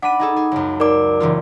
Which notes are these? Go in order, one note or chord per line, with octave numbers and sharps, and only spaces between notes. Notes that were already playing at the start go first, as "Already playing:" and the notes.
D4 F#5 B5 D6 D#7
D#4 G#4 A4
G#4
C#2 F#2
D#4 A#4 D5 D6
F#1 E3 F4